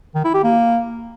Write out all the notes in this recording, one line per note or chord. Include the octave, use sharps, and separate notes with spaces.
D#3
E4
G4
A#3